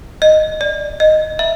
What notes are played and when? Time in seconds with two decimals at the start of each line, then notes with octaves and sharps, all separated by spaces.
0.22 D#5
0.61 D5
1.00 D#5
1.39 E5